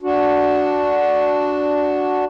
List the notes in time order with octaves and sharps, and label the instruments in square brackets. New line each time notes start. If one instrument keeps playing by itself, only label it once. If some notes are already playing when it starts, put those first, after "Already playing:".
[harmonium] D4 F#4